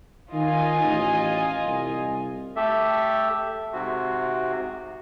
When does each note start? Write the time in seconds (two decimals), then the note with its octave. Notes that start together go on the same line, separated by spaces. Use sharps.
0.33 D#3 F4 D#5 G#5
0.83 A1
1.65 C2
2.56 A3 G4 A4 E5
3.73 G#2 C3 F#4